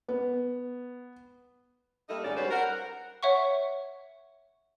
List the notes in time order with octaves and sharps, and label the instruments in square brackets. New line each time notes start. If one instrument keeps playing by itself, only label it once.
[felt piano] B3
[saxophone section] G3 A3 A#3 D#4 D#5
G#2 D#3 F#3 C#4 D#4 D5
G3 C#4 F#4 B4 C5
A#4 F#5
[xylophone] C#5 E5 F#5 C#6